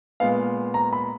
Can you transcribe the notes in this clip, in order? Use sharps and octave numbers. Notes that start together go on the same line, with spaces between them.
A#2 G#3 B3 F5
A#5
B5